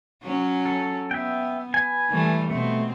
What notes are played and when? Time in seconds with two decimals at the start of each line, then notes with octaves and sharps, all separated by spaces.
0.23 F#3 C#4
0.66 A4
1.11 B3 E5 G5
1.74 B4 G#5
2.09 E3 G3 A3
2.50 B2 A3 C4